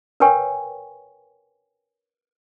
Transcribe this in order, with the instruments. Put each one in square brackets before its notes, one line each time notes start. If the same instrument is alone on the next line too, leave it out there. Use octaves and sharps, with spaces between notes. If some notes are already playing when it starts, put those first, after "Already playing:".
[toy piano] A#4 B4 C#5 G5 G#5 C#6